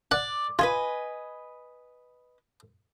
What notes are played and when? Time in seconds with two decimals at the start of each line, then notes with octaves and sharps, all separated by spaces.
0.11 D5 F#5
0.59 F4 B4 D#5 G#5